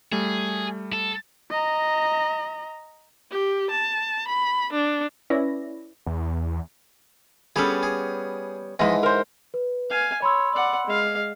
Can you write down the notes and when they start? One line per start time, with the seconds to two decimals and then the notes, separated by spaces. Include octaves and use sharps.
0.12 G3 A3 G#4
0.93 A4
1.50 D#5 A#5
3.31 G4
3.71 A5
4.28 B5
4.73 D4
5.30 C#4 E4 B4 D5 A#6
6.06 E2
7.56 G3 B3 C#4 G#4 A4
7.83 G#4
8.79 G#2 E3 F3 G3 D#5
9.03 A#4 C5
9.54 B4
9.90 F5 G#5
10.22 C#5 B5 C6 E6
10.54 D5 F#5
10.87 G#3 F5